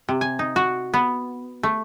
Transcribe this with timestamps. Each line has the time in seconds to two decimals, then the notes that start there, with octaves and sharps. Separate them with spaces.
0.09 C3
0.21 G#5
0.39 D#4
0.56 F#4
0.94 B3
1.63 A3